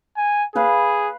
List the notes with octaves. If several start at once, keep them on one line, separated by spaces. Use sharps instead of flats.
G#5
G#4 B4 F5 B5